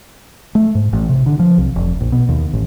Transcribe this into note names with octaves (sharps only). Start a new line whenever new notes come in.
A3
G#2
A1
C3
D3
F3
C2
F1
A#1
B2
D#2
A1